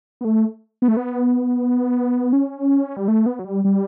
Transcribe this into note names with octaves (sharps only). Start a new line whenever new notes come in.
B3
A3
B3
A3
B3
C#4
G3
A3
B3
F#3
G3
G3